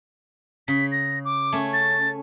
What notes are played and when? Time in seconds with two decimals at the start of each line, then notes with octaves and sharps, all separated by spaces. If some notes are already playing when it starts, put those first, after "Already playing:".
0.68 C#3 B6
0.92 A#6
1.25 D6
1.53 A3 C#4
1.73 A6